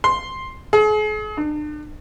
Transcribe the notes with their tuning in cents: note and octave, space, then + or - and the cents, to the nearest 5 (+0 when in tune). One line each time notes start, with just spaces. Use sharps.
C6 +5
G#4 +40
D4 +40